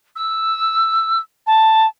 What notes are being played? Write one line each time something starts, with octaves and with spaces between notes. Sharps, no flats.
E6
A5